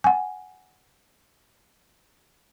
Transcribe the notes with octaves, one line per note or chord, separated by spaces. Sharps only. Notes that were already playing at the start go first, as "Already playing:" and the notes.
F#5 G#5